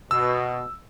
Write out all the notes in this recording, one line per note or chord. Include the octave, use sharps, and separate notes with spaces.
B2 E6